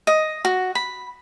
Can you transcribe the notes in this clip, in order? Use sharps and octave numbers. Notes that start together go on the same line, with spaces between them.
D#5
F#4
B5